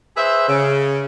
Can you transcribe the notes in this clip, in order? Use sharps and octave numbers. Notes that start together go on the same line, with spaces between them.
G#4 B4 C5 E5
C#3